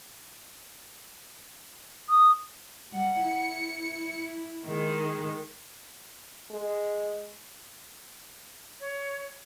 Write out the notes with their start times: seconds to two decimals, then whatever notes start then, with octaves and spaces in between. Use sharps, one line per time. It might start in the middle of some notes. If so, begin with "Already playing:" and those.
2.09 D#6
2.91 G3 F#5
3.23 E4 C#7
4.65 D#3 G#3
6.51 G#3
8.79 C#5